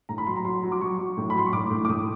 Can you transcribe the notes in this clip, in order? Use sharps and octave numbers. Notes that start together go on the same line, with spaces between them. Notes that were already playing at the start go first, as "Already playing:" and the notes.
A2 A#5
B5
F#3 C6
A#5
F#3 C6
F#3
D6
F#3 C#6
F#3
A2
B5
F#3 C6
C#6
A2 D6
A2
D6
A2 D#6